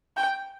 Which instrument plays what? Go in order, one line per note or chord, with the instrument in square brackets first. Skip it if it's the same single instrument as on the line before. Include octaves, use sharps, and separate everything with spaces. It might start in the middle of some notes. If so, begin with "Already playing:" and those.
[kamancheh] G5